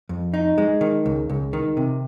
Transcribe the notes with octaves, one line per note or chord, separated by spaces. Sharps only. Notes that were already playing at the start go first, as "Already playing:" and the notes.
F2
D#4
G#3
D#3
C#2
C#2
D#3
C3